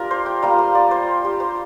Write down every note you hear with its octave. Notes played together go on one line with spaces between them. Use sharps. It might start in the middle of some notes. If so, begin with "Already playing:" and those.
Already playing: A#3 D4 F4 G4 A#4 D5
C5
G5
G3 A#3 F4 A#5
C6
D5
C5
G4
C5